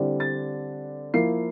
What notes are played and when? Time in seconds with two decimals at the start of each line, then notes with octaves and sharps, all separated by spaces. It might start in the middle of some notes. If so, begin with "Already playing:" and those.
Already playing: D3 G3 C4 E4
0.20 A6
1.14 F3 A#3 E4 C7